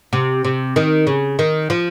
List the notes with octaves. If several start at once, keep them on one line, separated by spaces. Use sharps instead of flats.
C3
C3
D#3
C#3
D#3
F3